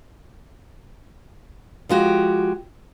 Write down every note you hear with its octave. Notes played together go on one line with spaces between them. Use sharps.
F3 G#3 F#4 G4